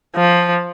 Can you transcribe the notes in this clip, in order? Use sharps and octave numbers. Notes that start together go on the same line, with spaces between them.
F3